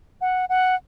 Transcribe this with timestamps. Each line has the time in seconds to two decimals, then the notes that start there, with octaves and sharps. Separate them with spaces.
0.21 F#5
0.49 F#5